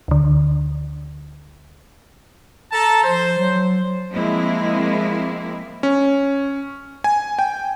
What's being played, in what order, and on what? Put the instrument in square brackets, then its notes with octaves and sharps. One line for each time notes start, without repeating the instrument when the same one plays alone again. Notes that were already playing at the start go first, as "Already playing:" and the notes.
[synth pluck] D2 D3
[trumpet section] A4 A5 A#5
[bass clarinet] F3 [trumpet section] C5
[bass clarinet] F#3
[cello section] F3 G#3 A#3 C4 E4
[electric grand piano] C#4
G#5
G5